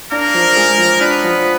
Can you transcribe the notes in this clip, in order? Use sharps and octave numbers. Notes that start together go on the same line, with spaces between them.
A#3 D4 A#4
F3
G#3
F3
B3 D4 B4
F3